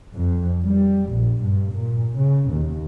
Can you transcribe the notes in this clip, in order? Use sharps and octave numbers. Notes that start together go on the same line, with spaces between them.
F2
G3
A#1
G2
A#2
C#3
D#2